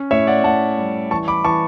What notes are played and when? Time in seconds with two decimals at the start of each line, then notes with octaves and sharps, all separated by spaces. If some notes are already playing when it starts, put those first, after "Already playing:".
Already playing: C#4
0.11 A2 C#5 E5
0.27 D5 F#5
0.44 A2 F#5 A5
0.78 G3
1.11 E3 A5 C#6
1.28 B5 D6
1.44 E3 A5 C#6